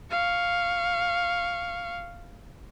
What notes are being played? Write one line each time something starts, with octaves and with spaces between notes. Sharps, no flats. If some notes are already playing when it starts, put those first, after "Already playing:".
F5 C#6